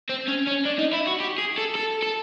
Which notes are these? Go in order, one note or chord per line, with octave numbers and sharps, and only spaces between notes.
C4
C#4
C#4
D4
D#4
E4
F#4
G4
G#4
A4
A4
A4